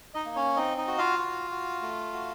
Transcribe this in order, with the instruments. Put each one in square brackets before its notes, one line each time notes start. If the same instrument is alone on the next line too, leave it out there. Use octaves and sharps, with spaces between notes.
[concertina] D#4 D#5
A#3
C#4 C#5
C4 D#4 D#5
D#4 D#5
F#4
F4 F5
F#4
F#4
A3
F#4